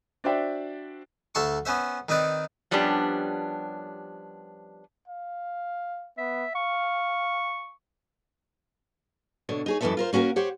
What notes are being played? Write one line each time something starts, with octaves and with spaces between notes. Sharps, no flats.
D4 F#4 C5 D5 E5 G5
D2 A4 E5 C6 C#6
B3 C#4 C5 E5
D#3 C4 D#4 B4 D5
F3 G3 B3 C#4 D4 G4
F5
B3 E5
F5 C#6
B2 D3 C#5
D#4 G#4 C#5
F#2 E3 G#3 C4 A4 E5
F4 A#4 C5
A#3 C#4 F#4 G4 A#4
G4 C5 C#5 F#5